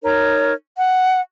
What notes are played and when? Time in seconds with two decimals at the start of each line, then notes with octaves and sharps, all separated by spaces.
0.02 D#4 A#4 C#5 A#5
0.76 F#5